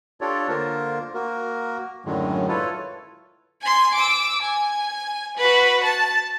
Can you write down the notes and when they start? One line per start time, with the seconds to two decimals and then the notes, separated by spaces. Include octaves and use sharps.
0.21 D4 F4 G4 A4 C#5 D5
0.49 D3 A#3 F4 A#4 C5
1.14 A#3 F#4 A#4
2.05 F#2 A2 D3 D#3 F#3 G#3
2.48 E4 F4 A4 B4 C#5
3.62 G#5 C6
3.95 D6 E6
4.41 G#5
5.37 F#4 B4
5.84 A5